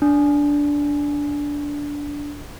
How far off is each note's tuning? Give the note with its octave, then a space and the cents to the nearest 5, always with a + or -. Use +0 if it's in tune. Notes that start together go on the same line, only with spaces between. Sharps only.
D4 -15